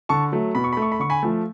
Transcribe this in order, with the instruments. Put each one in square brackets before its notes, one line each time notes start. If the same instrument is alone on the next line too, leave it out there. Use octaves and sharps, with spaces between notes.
[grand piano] D3 A5 C#6
F#3 A3
B2 B5
C#6
B5
A3
C#6
B5
D3 C#6
G#5 B5
F3 A3